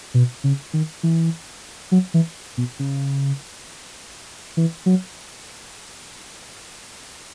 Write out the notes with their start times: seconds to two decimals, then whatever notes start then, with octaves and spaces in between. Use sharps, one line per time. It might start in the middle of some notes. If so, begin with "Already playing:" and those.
0.14 B2
0.44 C#3
0.73 D#3
1.03 E3
1.92 F#3
2.14 E3
2.57 B2
2.79 C#3
4.57 E3
4.86 F#3